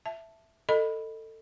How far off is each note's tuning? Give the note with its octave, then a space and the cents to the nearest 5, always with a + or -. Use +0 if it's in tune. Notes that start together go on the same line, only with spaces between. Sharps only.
E5 +0 A5 +0
A4 +20 D#5 -10 B5 +0